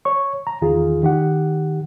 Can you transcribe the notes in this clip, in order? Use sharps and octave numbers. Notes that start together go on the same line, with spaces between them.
C#5 C#6
A#5
E2 D#3 F4 G#4
D#3 G4 F#5